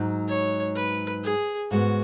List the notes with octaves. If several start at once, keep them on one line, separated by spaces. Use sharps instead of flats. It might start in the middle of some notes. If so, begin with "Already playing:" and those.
Already playing: G#2 F#3 D#4
C#5
B4
G#4
G#2 G#3 B3 F#4